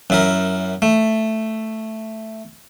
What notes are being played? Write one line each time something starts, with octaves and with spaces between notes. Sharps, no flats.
F#2 E4 A#4
A3